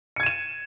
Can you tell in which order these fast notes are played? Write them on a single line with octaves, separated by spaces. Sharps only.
C#7 G#6 D#7 E7